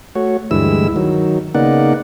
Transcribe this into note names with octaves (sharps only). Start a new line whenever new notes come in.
A3 F#4 C#5
D2 G2 E3 G#3 E4 E6
D#3 F#3
C#3 A#3 B3 D#4 D5 F#5